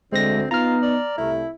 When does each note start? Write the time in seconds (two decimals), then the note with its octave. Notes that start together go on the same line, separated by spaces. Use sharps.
0.12 D2 G#3 C4 A#6
0.51 B3 D#4 F4 A#5 F6
0.83 D5
1.18 C2 A3 E4